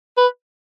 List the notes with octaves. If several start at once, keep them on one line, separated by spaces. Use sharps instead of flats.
B4